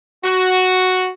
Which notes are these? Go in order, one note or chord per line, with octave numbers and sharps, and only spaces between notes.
F#4